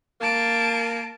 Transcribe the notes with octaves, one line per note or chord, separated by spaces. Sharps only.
A#3 A5 D7